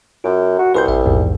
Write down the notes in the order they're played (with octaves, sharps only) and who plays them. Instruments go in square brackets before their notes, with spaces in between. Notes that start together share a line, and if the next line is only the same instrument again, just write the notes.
[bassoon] F#2 [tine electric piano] F4
[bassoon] F#4
[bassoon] C2 [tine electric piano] B4 C6 G6
[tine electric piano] A1 E5
A#1 E2 G#2